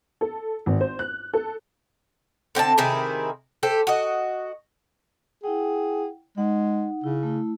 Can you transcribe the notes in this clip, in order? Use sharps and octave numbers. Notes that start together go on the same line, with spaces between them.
A4
G#1
C5
F#6
A4
D3 C4 D4 A5
C3 D#3 E4 G#4
G4 A4 C5
F#4 D#5
E4 G#4 F#5 G5
G#3 D#4 F#5
C#3 E4
A3 E4